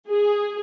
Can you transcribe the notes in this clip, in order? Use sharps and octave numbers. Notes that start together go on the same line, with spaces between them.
G#4